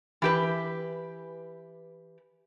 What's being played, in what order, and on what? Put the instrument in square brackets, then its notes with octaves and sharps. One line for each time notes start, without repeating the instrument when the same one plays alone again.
[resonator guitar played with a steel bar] E3 G4 B4